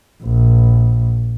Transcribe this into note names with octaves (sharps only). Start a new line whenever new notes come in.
A#1